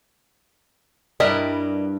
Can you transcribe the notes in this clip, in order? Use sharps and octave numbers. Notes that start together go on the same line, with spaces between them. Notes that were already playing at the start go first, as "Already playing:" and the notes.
G2 G3 D4 E4 A#4 D#5